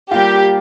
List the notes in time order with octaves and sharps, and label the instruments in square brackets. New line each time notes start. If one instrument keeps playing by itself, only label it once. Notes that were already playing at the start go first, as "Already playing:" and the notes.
[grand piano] G3 A#3 F4 [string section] G4